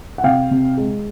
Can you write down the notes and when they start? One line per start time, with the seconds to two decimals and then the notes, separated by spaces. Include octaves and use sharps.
0.18 F#5
0.24 C3 F5 G5
0.51 C3
0.77 G#3